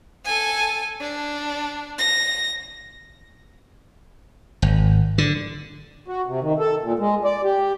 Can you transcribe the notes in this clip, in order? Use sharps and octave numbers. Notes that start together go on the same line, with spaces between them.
A4 G#5
D4
A#6
G#1
D3
F#4
C3
D#3
A4
A#2
G#3
D5
G4